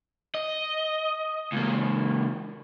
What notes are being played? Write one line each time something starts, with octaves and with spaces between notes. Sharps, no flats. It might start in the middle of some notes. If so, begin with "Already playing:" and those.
D#5
C#2 A#3